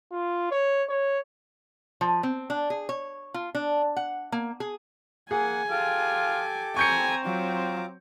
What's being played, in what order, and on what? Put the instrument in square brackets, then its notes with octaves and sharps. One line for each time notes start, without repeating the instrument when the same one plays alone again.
[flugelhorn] F4
C#5
C#5
[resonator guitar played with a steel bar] F3
C4
D4
G#4
C#5
F4
D4
F#5
A#3
G#4
[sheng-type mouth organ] A#3 F#5 [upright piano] G#4 [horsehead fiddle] G#5
[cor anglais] F4 [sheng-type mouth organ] G4 A4 D6
[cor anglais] C4 [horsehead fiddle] G#5 A#5 [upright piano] C#6 G6 C#7
[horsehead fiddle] F#3 [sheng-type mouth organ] F4 A#5 D6